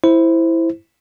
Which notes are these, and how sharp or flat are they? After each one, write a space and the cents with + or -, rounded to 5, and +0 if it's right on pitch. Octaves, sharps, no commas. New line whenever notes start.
E4 +0 C5 +0